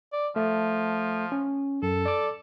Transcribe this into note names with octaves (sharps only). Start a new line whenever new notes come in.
D5
F3 A3
C#4
F#2 A4
D5 D6